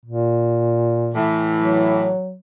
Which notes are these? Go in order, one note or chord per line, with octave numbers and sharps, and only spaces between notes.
A#2
A2 E3
F#3